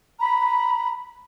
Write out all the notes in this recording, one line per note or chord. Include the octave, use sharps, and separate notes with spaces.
A#5 B5